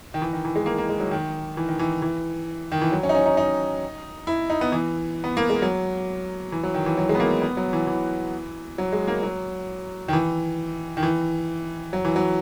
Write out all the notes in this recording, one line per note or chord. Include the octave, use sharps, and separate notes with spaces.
D#3
E3
D#3
E3
G#3
A#3
A#3
G#3
F#3
D#3
E3
D#3
E3
E3
D#3
E3
F#3
C#4
D#4
C#4
D#4
D#4
E4
D#4
B3
E3
B3
A#3
G#3
F#3
E3
F#3
D#3
E3
F#3
G#3
B3
A#3
B3
F#3
E3
E3
F#3
G#3
A#3
F#3
D#3
E3
D#3
E3
F#3
E3
F#3